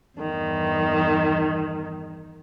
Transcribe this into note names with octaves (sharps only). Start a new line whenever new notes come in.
E2 G2 D#3